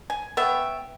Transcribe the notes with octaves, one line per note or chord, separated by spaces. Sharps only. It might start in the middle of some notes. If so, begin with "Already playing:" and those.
G#5
B3 C#5 E5 G5